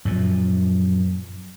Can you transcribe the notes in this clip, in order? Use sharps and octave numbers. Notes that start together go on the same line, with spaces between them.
F#2 A#2 F3